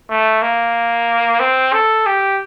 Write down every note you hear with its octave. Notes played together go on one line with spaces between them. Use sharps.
A3
A#3
C4
A4
G4